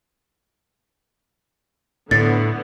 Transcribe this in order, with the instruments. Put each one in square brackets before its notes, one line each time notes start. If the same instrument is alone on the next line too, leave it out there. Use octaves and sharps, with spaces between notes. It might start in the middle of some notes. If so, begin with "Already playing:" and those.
[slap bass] A2 [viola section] D3 B3 [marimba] A6